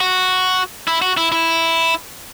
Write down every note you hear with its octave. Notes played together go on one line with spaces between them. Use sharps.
F#4
E4
F#4
E4
E4